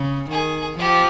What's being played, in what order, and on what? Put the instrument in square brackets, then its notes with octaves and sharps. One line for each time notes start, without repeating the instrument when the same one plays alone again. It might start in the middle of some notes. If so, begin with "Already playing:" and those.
Already playing: [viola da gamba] C#3
[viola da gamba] D#3 [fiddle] G#4
[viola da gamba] F3 [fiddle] G4